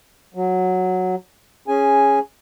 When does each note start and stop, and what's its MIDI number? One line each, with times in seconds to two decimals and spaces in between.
0.34 1.15 54
1.68 2.19 61
1.68 2.19 68
1.68 2.19 80